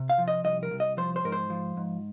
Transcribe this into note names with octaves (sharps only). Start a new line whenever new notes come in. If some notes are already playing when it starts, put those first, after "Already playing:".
Already playing: C3
F5
F3
D#5
C2 D#5
A#4
C2
D#5
F3 C5
C5
G#2 A#4
C5
F3
G#2